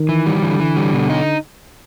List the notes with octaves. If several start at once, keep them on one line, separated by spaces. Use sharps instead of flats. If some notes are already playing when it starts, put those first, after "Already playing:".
Already playing: D#3
E3
G3
D3 E3
E3
G3
B2
D#4